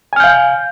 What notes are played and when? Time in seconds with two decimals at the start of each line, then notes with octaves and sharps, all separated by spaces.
0.13 G#5
0.16 F6
0.20 G6
0.24 F5